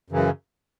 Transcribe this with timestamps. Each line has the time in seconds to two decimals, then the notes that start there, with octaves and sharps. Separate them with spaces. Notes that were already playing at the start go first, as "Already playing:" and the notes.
0.10 F#2 C#3 E3